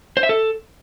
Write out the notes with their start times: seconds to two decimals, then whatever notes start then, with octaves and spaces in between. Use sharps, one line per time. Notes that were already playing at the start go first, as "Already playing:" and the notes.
0.17 C5
0.23 E5
0.29 A4